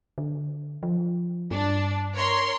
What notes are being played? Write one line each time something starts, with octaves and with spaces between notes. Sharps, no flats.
D3
F3
G2 D4
A#4 C#5 C6